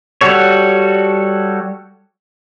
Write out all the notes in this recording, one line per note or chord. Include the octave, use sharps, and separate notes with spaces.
G3 F#4 A4 C#5